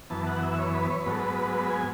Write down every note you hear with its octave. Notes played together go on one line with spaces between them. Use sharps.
F#2 E3 B3 A5
F#5
E5
C#5
B4
C#5
B4
G#2 F#3 B3 A4
B4
B4
G#5